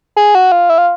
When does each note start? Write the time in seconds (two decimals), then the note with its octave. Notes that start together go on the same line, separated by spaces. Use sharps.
0.16 G#4
0.35 F#4
0.52 F4
0.70 E4
0.78 F4